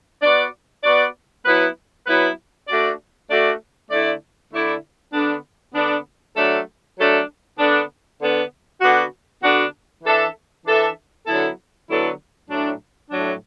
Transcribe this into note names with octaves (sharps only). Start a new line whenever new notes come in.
B3 F#4 D5
B3 F#4 D5
F#3 B3 E4 B4
F#3 B3 E4 B4
A3 D4 F#4 D5
A3 D4 F#4 D5
D3 A3 E4 D5
D3 A3 E4 D5
D3 B3 D4
D3 B3 D4
F#3 A3 D4 A4
F#3 A3 D4 A4
D3 B3 D4
D3 B3 D4
D3 B3 D4 F#4
D3 B3 D4 F#4
E3 D4 A4 E5
E3 D4 A4 E5
D3 F#3 B3 E4 A4
D3 F#3 B3 E4 A4
A2 F#3 D4
A2 F#3 D4